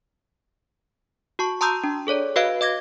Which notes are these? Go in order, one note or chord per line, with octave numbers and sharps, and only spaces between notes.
F#4 A5 C#6
A5 A#5 C6 D#6 E6 G6
D4
G#4 A4 C#5 D5
F#4 B4 D#5 F5 F#6 D7
D#5 D6 G#6 A#6